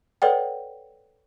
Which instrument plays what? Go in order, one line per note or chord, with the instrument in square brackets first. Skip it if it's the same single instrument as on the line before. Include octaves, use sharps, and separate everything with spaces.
[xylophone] A4 B4 C#5 D5 F#5 G5